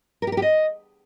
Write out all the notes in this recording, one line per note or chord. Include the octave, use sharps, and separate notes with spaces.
A#4
G4
A#4
G4
D#5